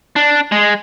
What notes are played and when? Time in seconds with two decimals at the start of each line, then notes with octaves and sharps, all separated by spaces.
0.16 D4
0.52 G#3